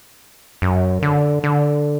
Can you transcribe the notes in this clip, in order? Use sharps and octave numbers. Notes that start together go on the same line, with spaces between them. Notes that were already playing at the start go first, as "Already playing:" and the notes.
F#2
D3
D3